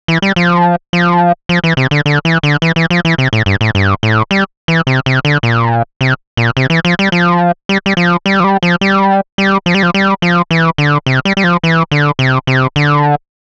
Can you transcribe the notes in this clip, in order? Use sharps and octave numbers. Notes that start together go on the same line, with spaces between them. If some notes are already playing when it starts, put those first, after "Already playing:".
E3
G3
F3
F3
F3
E3
C3
D3
D3
E3
D3
E3
E3
F3
E3
C3
A2
G2
A2
G2
A2
G3
E3
C3
C3
D3
A#2
C3
A#2
C3
E3
F3
G3
F3
G3
G3
F3
G3
F3
G3
F3
G3
G3
F3
G3
F3
G3
F3
E3
D3
C3
G3
G3
F3
E3
D3
C3
C3
D3